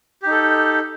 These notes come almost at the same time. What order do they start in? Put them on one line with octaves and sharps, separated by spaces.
G4 D#4 A4